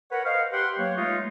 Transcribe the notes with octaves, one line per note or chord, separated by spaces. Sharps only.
A#4 B4 C#5 F#5
C5 D#5 F5
G4 B4 F#5 G5 C6
F#3 A#3 C#5
G#3 A3 D#4 F4